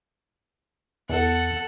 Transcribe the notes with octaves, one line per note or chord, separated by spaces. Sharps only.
E2 A4 F#5